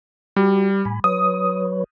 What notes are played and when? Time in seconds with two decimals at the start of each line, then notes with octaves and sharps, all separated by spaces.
0.36 G3 F#4
0.85 A2 G#5 B5
1.04 F#3 B4 C#5 D#6